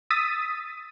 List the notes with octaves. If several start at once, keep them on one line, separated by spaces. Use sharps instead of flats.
D#6 E6 A6 B6 D#7